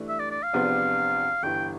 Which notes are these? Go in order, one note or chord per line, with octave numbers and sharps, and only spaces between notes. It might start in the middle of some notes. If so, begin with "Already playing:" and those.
Already playing: G2 E3 A3 D4
E5
D5
D5
F5
E2 C3 F3 B3 D4
G1 G2 E3 G5